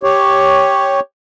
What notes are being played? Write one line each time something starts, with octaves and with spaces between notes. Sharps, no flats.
G4 C#5